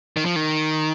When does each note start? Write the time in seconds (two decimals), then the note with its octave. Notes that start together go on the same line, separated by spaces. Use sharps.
0.17 D#3
0.25 F3
0.36 D#3